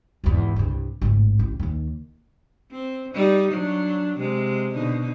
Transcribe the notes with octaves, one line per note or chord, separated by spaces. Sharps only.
G#1 E2
C2 G2
G#1 A2
A1
D#2 D#3
C4
G3 D#4
F#3 D4
C3 G#3
B2 D3 D#4